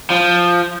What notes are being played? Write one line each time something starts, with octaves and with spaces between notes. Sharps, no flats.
F3